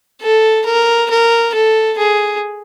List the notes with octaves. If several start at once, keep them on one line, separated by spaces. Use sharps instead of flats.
A4
A#4
A#4
A4
G#4